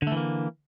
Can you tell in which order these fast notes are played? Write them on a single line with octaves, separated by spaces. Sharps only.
D3 A3 E3 A#3